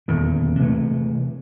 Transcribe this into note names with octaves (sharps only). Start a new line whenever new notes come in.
D#1 E2 D3
C3 E3 G#3 A3